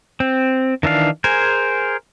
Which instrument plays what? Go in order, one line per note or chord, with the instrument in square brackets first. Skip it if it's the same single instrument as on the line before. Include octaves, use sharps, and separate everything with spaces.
[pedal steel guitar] C4
D#3 E3 D4 F5
G#4 A#4 C5 G#5